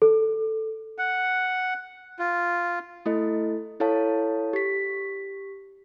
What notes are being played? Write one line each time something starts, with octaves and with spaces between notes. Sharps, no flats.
A4
F#5
F4
A3 E4 A4 D#5
E4 A4 C#5 F5 A5
G4 B6